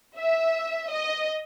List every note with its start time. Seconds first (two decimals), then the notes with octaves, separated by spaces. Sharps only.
0.17 E5
0.90 D#5